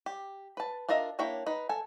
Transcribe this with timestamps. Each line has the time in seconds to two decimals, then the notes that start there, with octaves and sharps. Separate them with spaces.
0.06 G4
0.57 B4 A5
0.89 D4 F4 A#4 D#5 E5
1.19 A#3 D4 E4 C#5 G5
1.46 D#4 B4
1.69 A4 G#5